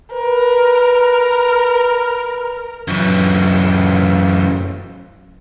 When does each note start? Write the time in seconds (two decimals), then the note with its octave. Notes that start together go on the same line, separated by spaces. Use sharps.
0.13 A#4 B4
2.88 F#2 E3